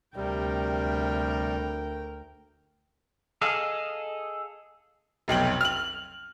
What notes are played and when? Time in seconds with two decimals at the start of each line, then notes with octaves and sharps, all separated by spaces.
0.16 D2 C3 G3 A#4 G5
3.41 G#4 A4 D#5 F5
5.28 F1 B1 G5 F#7
5.61 F6 F#7